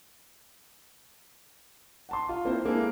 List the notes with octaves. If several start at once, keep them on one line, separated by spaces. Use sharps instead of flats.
F#5 A5 C6
F4
A#3 C4 E4 C5
G#3 A#3 D4 E4 G#4 A4